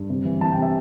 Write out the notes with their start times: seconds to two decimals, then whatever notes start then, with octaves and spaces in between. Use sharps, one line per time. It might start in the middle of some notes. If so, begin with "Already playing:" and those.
Already playing: G2
0.09 C3
0.25 E3
0.41 E3 A5
0.52 G5
0.57 C3
0.62 E5